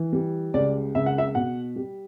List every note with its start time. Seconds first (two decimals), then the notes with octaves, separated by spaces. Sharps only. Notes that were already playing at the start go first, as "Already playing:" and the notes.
Already playing: E3
0.13 G3
0.54 C#2 D5
0.95 C#2 E5
1.06 F#5
1.18 E5
1.35 B2 F#5
1.76 G3